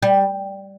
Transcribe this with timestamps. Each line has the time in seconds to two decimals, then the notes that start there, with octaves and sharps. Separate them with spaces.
0.02 G3